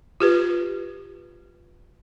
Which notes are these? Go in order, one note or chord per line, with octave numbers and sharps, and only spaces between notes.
F4 G4 B4